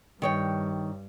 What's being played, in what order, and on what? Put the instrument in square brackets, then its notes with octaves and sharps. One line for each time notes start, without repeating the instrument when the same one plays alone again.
[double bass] G2 [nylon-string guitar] D#3 C#5 G5